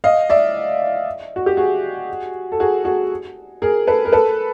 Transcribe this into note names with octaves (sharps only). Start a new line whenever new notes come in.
D#5 F5
D5 E5
F#4
G4
F#4 G#4
A4
F#4 G#4
F#4 G#4
G#4 A#4
A4 B4
A#4
A4 B4